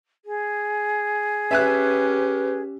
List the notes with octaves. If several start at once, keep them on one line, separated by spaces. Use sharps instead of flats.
G#4
C#4 G4 B4 E5 G#5 F#6